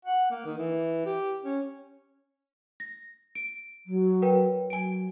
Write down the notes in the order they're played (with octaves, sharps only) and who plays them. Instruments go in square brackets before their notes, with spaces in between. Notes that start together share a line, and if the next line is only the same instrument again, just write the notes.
[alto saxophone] F#5
A#3
D#3
E3
G4
C#4
[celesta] A#6
D7
[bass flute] F#3
[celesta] A#4 B4 G5
[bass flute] F#3 [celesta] G#5 D7